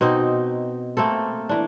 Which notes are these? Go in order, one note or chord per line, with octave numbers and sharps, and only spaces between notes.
B2 C4 D#4
A3 A#3 C4 A4
E3 D4